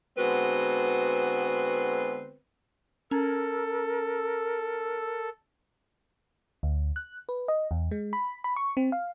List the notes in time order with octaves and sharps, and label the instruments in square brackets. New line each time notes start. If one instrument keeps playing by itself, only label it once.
[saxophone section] D3 G#3 B3 C4 F#4 B4
[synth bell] C#4 A#5 G#6 [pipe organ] A4 [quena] A#4
[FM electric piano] D2
F#6
B4
D#5
E2
G#3
B5
B5
C#6
C4
F5